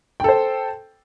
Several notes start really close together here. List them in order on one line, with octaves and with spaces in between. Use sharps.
G5 A4 C5